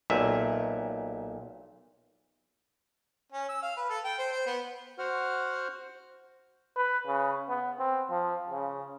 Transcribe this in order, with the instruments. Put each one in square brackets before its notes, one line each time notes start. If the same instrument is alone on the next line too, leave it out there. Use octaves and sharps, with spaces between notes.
[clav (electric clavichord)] B1 A#2 E5
[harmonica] C#4
E6
F5
B4
A4
G5
C5
C5
B3
[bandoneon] F#4 C5 F#5 F6
[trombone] B4
C#3
B3
C4
F3
C#3